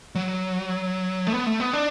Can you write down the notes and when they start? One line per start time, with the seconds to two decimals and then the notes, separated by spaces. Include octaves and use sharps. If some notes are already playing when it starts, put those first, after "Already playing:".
0.15 F#3
1.27 A3
1.34 B3
1.46 A3
1.60 B3
1.74 D4